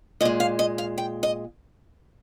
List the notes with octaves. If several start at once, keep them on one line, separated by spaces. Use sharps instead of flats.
A#2 G#3 D#5
F5
D#5
F5
G5
D#5